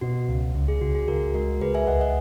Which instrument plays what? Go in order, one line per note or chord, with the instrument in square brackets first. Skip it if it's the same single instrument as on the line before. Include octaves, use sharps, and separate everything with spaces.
[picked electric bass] B2 [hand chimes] F#4
[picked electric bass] C#2
C#2
[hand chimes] G#4
[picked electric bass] C#2 [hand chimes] F#4
[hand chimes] G#4
[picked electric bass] C#2 [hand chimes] F#4 A#4
[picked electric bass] G#3 [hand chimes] F#4 A#4
[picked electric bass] C#2 [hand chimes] G#4 B4
[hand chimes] E5 G#5
[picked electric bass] C#2 [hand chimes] D#5 F#5
[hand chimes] D#5 F#5